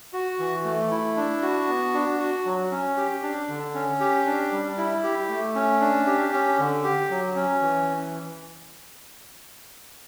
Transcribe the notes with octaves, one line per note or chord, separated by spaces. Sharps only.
F#4
E3
A3
E4
D4
F#4
B3
D4
F#4
F#3
C#4
G4
D4
D3
C#4
G4
D4
G3
E4
G4
A3
C#4
D4
G4
C#4
D3
G4
F#3
C#4
E3